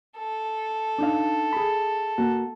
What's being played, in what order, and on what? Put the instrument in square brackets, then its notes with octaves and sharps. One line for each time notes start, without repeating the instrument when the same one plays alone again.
[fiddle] A4
[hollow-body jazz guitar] D4 D#4 F5
G#4 B5
A#3 F#4